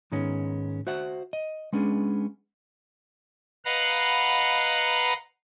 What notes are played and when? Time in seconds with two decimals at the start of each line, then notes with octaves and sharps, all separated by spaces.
0.12 G#2 D#3 G#3 B3 C#4
0.87 F#4 C5 E5 F#5
1.33 D#5
1.73 G#3 B3 C#4 D4 G#4
3.65 B4 D#5 F5 F#5 A#5 B5